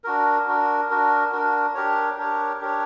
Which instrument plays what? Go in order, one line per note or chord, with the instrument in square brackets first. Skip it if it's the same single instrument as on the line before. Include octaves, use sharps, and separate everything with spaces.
[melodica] D4 F#4 A#4
D4 F#4 A#4
D4 F#4 A#4
D4 F#4 A#4
D4 G4 A#4 C#5
D4 G4 A#4 C#5
D4 G4 A#4 C#5